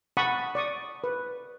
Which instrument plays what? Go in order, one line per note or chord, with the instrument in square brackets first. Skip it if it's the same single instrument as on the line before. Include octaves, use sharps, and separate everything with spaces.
[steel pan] F#5 A5 B5 C#6 D#6
D5 C#6 D#6
B4